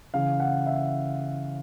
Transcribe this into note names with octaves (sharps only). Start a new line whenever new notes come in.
C#3 E3 F5
F#5
E5